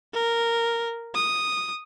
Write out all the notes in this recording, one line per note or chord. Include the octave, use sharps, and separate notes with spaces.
A#4
D#6